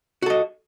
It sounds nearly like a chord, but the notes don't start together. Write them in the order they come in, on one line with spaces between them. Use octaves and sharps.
F#4 A4 D#5